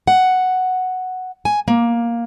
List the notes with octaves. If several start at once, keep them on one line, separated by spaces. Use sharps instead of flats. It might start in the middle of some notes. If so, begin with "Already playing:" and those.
F#5
G#5
A#3